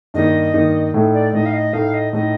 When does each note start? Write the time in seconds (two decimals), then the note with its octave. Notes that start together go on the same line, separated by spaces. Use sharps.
0.14 G2 D#3 A#3 D#4 D#5
0.54 G2 D#3 A#3 D#4
0.94 A2 A3 D#4
1.14 D5
1.33 A2 A3 D#4 D#5
1.46 F5
1.53 D#5
1.73 A2 A3 D#4 F5
1.94 D#5
2.13 A2 A3 D#4 D#5